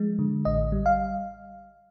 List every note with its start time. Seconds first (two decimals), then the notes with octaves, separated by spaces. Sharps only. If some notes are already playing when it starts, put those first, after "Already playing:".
Already playing: F3 G#3
0.19 D3
0.45 A1 D#5
0.72 G3
0.86 F5